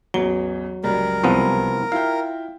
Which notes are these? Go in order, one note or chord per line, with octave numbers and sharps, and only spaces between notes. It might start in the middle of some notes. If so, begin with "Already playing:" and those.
A1 E2 F#3 G7
C#2 F#2 G3 A#4
C2 F3 B3
E4 F4 F5 G5